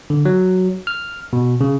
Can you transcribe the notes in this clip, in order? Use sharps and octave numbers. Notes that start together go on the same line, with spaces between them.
D3
F#3
F6
B2
C#3